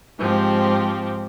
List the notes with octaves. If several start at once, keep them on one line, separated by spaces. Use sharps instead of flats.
G#2 F3 C4 G4